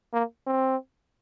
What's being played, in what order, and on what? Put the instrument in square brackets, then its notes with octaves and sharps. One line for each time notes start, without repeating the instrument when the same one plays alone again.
[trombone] A#3
C4